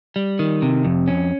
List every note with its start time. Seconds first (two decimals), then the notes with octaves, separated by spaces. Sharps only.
0.16 G3
0.39 D#3
0.62 C3
0.85 F2
1.07 C#4